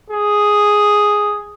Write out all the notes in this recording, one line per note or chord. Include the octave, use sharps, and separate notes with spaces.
G#4